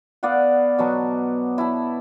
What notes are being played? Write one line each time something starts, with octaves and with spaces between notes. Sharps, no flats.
B3 D5 F5 F#5
B2 F#3 B3 A5
E4 A5